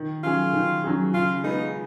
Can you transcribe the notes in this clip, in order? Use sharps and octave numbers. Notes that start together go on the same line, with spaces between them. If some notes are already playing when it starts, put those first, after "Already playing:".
Already playing: D#3
F#3 C#4 F4 G#4
D#3
F#3 C#4 G#4
C#3 F4
G#3 B3 D#4